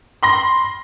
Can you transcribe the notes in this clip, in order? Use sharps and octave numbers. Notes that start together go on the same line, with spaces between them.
B5 C6 A#6